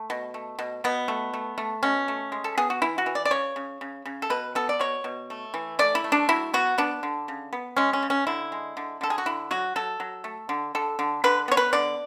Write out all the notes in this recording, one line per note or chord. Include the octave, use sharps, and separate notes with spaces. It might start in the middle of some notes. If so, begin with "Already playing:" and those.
Already playing: A3
B2
A3
B2
B2 B3
A3
A3
A3
B2 C#4
A3
G#3
A4
B3 G#4
F#4
E3 E4
F#4
E3
D5
D5
C#3 C#5
C#3
C#3
C#3
A4
B2 B4
B3 A4
D5
B2 C#5
B2
A3
E3
A3 D5
E4
A3
D4
F#3 E4
B3 F#4
B3 D4
D3
C#3
B3
G#3 C#4
C#4
C#3
C#4
D3 E4
G#3
D3
D3 A4
G#4
F#4
D3 E4
F#3 F#4
F#3 A4
F#3
A3
D3
D3 A4
D3
D3 B4
B3 C#5
B4
D3 D5